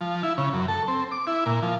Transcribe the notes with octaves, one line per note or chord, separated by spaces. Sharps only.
F3
E4
C#3
F#2
A4
C4
D6
E4
A#2
F3